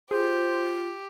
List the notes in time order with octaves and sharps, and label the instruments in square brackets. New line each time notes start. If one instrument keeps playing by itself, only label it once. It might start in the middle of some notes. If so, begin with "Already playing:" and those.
[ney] F4 [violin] G4 [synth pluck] G#4 [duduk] C5